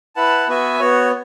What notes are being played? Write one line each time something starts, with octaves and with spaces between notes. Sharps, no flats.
E4 B4 F#5 A5
B3 F#4 B4 E5 G#5
B3 F#4 C#5